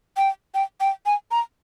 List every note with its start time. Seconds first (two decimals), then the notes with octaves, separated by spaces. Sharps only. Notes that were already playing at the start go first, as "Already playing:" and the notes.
0.17 G5
0.54 G5
0.80 G5
1.06 G#5
1.31 A#5